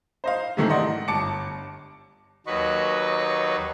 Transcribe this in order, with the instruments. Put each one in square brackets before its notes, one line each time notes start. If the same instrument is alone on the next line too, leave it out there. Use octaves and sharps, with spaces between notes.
[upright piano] C5 D#5 F5
G#2 C3 D#3 E3 A3
D5 D#5 F#5 C6
G1 A5 D6 C#7
[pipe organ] D#2 F#3 B4 [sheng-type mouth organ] D#5 C#6